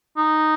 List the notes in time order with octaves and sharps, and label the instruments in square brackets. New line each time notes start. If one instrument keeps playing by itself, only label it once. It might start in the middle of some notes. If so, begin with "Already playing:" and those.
[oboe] D#4